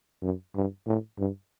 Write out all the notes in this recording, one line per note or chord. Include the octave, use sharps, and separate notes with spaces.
F#2
G2
A2
G2